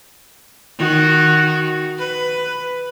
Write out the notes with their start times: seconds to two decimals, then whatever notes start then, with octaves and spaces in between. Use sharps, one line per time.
0.79 D#3 F#4
1.98 B4